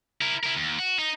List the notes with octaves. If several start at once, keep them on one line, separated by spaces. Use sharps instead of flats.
E4 A#4
E4 A#4
D#2
F#4
D#4